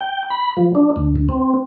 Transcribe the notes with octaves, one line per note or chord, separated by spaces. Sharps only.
G5
B5
F3
D4
D2
D2
C4